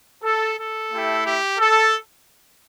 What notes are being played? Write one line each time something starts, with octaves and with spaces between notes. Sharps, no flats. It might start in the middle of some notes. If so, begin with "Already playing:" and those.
A4
A4
A3 E4 G4
G4
A4